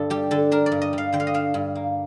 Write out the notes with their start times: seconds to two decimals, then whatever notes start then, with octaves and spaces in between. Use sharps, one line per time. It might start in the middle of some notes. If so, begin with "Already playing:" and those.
Already playing: G2 D3 D4 A4
0.10 G3 G4
0.31 D3 A4
0.51 D4 A#4
0.66 D5
0.72 G2
0.82 D#5
0.93 G3 F5
1.13 D3 G5
1.20 F5
1.27 D#5
1.34 D4 F5
1.54 G2
1.75 A#3